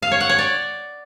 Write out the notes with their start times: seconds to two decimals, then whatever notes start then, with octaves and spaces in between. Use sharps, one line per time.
0.02 F5
0.11 C#5
0.20 F#5
0.29 C#5
0.38 D5